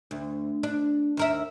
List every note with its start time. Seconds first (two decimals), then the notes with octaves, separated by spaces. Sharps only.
0.11 D2
0.63 D4
1.17 D#2 A#4 E5